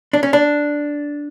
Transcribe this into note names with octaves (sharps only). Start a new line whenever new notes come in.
D4
C#4
D4